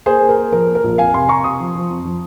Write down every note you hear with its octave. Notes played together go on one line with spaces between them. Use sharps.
A#3 G#4 C5
A#3
A#4
A#3
F3 A#4
A#3
A#4
A#1
F2 F5 G#5
C3 G#5 C6
C3 A#5 C#6
C3 C6 D#6
F3
F3
F2
F3